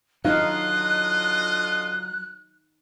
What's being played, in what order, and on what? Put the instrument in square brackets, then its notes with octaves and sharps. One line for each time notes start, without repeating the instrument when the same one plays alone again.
[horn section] D3 F4 D#5 [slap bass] F#3 [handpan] D#4 F5 [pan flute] F#6